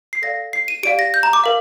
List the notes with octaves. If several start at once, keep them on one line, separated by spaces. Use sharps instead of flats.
C7
A4 D5 F5 A#6
C7
D#7
G4 D5 F5 D7
A#6
G6
A#5
D6
A#4 F5